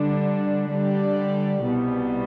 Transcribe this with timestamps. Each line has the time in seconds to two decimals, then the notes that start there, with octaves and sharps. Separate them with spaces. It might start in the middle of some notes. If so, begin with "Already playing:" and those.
Already playing: D3 G3 D4
0.71 D3 G3 D4 G4 D5
1.62 C2 B2 G3 B3